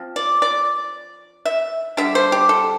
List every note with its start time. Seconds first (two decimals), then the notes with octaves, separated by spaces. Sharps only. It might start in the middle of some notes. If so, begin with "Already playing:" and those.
Already playing: F3 C4
0.16 D5
0.42 D5
1.45 E5
1.97 D3 G3 D4 E5
2.15 C5
2.32 G4
2.49 A4